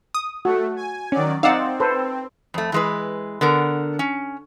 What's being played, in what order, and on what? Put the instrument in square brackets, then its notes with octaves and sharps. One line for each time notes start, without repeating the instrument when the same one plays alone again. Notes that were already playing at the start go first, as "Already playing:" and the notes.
[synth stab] D#6
[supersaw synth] A3 [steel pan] F#4
[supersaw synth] G#5
[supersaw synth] D#3 F#3 D5 [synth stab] C#4
[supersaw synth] C4 [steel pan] D#4 D5 E6 [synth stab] F5 F#5
[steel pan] A4 B4 C5
[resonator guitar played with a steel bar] F2 A3
E3 G#3 B4
D3 B3 A#4
C#4